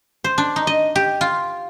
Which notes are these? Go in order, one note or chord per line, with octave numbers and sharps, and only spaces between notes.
C5
D4
D#4
D#5
G4
F4